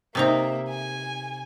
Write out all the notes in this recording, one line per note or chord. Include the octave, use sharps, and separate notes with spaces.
C3 A#3 D#4 E5 A#5
G#5